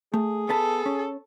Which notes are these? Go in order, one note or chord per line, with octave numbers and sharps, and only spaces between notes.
A3 G#4
B3 A4 B4 A5
C#4